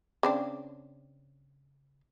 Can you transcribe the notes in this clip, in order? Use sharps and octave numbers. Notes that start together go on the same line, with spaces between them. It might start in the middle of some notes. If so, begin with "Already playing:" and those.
C#3 C4 D4